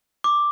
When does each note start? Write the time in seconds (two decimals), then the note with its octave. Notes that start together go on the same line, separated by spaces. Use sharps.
0.24 D6